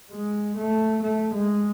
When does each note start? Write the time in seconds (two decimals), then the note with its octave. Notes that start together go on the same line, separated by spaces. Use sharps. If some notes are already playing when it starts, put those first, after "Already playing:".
0.12 G#3
0.57 A3
1.03 A3
1.34 G#3